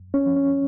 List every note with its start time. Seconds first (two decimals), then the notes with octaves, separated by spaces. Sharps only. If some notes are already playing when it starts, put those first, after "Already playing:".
Already playing: F#2
0.14 C#4
0.26 F3
0.36 C#4